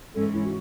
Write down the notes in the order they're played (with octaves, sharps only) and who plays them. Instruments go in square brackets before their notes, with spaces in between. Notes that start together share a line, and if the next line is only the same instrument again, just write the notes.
[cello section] G#2 E3 G#3 C#4 [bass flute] A4
[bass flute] E4
F#4